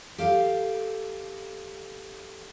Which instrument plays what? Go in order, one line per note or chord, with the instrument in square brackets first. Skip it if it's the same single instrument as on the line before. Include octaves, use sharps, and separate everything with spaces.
[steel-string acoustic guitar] G4 A4 F5